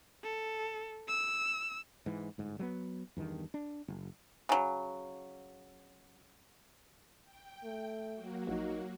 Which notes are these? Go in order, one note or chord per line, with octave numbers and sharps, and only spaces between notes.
A4
E6
G#2 E3
G1 G#2
F#3 G3 B3
E2 G2 D#3
D4
F#1
C#3 F#3
G5
A3
F#3 A#3 F#4
A#1 D#4